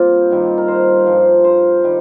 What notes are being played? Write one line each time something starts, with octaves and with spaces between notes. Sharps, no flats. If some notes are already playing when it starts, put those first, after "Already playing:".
Already playing: A#2 G3 A#3 C4 F4 G4
G2 D#3 G3
A#4
C5
G2 F3
C5
D#3 G3